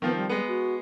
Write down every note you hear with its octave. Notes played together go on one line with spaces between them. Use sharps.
D#3 F3 B3 C4
G3
G#3 B3
F#4